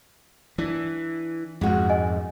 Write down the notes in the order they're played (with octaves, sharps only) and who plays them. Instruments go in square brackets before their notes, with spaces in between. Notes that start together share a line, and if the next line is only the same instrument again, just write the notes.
[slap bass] E3 [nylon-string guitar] D4
[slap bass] F2 G#2 [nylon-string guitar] G#3 F#4
[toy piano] D#5 G#5